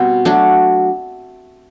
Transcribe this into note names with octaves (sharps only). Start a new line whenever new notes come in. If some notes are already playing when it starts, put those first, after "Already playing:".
Already playing: B2 G3 C4
F#3 A3 D4 F#4